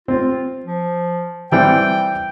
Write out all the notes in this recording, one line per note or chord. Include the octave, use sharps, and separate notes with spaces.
C4 F4
F3
E3 G3 C4 G5